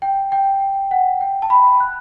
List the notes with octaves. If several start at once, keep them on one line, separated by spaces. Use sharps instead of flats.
G5
G5
F#5
G5
A5
B5
F#6